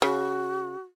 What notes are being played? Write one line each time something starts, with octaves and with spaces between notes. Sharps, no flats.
C#3 F#4